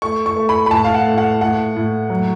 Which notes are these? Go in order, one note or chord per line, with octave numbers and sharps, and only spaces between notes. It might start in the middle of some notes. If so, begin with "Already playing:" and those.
A3 C#6
C#6
A3
B5
B5
A2 A5
F5
F#5
A2
F#5
A2 F#5
A2
F#3